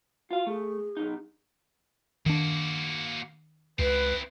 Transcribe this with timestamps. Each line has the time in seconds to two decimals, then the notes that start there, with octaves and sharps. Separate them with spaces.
0.31 F4 F#4 F5
0.47 A3 G#4
0.97 B1 G#2 D#4
2.26 D#3 A#3 D4 F#4
3.79 C#2 C4 E4 B4